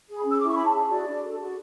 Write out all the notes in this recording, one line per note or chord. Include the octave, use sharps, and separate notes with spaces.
G#4
B5
C#4
E6
E4 D6
C#6
C#5 B5
A5
G#4
F#4 D5
D4
A4
F#4